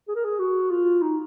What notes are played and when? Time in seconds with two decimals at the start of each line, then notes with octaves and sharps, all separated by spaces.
0.08 G#4
0.16 A#4
0.25 G#4
0.39 F#4
0.71 F4
1.02 D#4